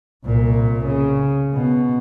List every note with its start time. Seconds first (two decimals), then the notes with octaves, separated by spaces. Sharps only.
0.25 C2 A#2
0.86 C#3
1.53 B2